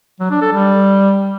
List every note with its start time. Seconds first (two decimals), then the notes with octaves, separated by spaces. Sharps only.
0.20 F#3
0.31 D4
0.41 A4
0.52 G3